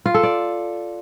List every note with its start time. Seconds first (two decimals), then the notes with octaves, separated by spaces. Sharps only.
0.06 F4
0.14 A4
0.23 D5